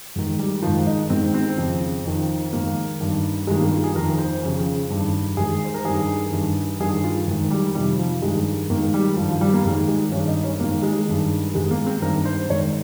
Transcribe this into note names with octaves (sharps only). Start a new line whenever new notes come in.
G#2 D#3
G3
G#2 D#3 F3
D#4
G#2 D#3 C4
C4
F2 C#3
F2 D#3
G#2 D#3 A#3
G2 D#3
G2 D#3 G#3
A#3
F4
G#4
F2 D#3 A#4
C5
F2 C#3
G2 D#3
G#2 D#3 G#4
C5
A#4
G2 D#3 G#4
G2 D#3
G2 D#3 G#4
F4
G#2 D#3
G3
F2 C3 D#3 G3
F3
G2 D#3 G#3
G#2 D#3 A#3
G3
G2 D#3 F3
F3
G3
A#3
G#2 D#3 G#3
G#3
G2 D#3 C#4
D#4
C#4
G#2 D#3 A#3
G#3
G2 D#3
G#2 D#3 G#3
A#3
C4
G2 D#3 A#4
C5
G#2 D#3 C#5